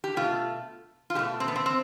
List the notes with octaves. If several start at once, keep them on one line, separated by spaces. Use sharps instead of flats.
G4
B2 A3 F4
F4
B2 A3 G4
C4
B3
C4
C4